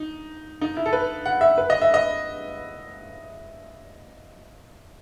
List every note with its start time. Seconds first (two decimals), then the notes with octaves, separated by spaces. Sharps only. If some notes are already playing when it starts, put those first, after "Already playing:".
Already playing: D#4
0.61 D#4
0.77 E4
0.86 A4
0.93 B4
1.26 F#5
1.41 E5
1.58 B4
1.70 D#5
1.82 E5
1.94 D#5